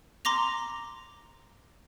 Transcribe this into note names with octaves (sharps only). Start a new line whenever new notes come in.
A#5 C6 D6 A#6 F7